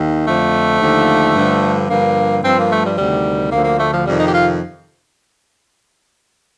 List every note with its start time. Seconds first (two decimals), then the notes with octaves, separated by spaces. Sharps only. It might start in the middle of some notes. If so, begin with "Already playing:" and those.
Already playing: D#2 D#3
0.27 F2 D3 F3 A3
0.81 D#2 D3 F3
1.35 G2 D3 F3
1.89 G2 D3 F3 A#3
2.43 G2 F3 C4
2.57 A#3
2.70 A3
2.84 G3
2.97 D2 C3 D#3 G3
3.51 D2 D3 F3 A#3
3.64 A#3
3.78 A3
3.92 F3
4.05 F2 C3 D#3 G3
4.18 D#4
4.26 G4
4.33 F4